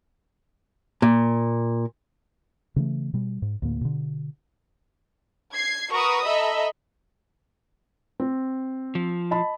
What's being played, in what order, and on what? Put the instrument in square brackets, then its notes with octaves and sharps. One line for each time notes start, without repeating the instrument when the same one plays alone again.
[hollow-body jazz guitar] A#2
[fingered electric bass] C#3 E3 A3
B2 G3
G#2
D2 A2 A#3
B2 D3
[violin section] G#6 C7
F#4 A#4 B4 A#5 C#6 D#6
A4 D#5 E5 A#5 B5
[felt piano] C4
[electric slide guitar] F3
[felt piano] D#5 A5 B5